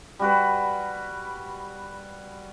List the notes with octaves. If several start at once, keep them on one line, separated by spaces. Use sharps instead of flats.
G3 F#4 B4